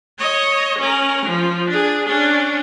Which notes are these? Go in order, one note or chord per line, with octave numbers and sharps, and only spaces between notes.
C#5 D#5
C#4 A#4
F3
D4 G#4
C#4 D4